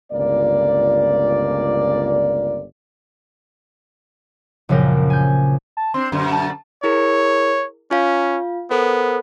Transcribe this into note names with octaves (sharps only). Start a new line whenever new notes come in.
G1 C#2 A#3 D5
A#1 F#2 C#3 F3 A#4 G5
G#5 G6
A5
C4 D4 C6
F#2 B2 D3
A5
E4 G#4 A#4 C#5
C#4 F4 F5
B3 A4 A#4 C5